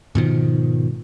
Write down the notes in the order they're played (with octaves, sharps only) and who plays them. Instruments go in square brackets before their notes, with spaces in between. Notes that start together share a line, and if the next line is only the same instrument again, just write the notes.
[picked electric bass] G#2 B2 D#3 F3